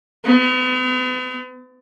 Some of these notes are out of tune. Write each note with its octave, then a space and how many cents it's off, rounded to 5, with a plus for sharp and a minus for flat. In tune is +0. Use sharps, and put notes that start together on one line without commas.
B3 +45